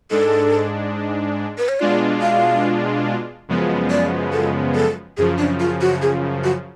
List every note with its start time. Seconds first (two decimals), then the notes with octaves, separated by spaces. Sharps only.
0.10 G#2 G#3 D4 A4
1.58 B4
1.69 C#5
1.80 B2 G#3 D4 F4 D5
2.22 F5
3.49 F#2 C#3 F3 G#3 B3
3.90 D5
4.33 A4
4.75 A4
5.17 F#2 C#3 F3 G#4
5.38 D4
5.60 F4
5.81 F#4
6.02 G#4
6.44 F#4